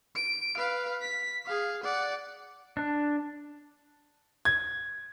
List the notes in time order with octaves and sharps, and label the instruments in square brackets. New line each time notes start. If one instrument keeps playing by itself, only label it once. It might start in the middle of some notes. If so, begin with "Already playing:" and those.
[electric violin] D7
B4 F5
B6
G#4 F5
D5 F#5
[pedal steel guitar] D4
[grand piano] G#6